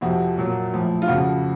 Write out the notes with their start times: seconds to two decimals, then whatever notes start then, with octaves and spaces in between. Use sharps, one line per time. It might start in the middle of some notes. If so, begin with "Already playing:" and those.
0.01 F2 C3 F3 F#4
0.37 A#2 F#3
0.72 A2 F3
1.02 F4
1.08 F2 C#3 F3 F#4